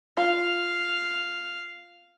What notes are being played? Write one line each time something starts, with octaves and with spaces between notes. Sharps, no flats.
F4 F5